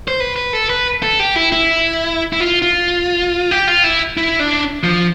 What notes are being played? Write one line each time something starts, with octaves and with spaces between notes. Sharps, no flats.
C5
B4
B4
A4
B4
A4
G4
E4
E4
E4
F4
F4
G4
F4
E4
E4
D4
F3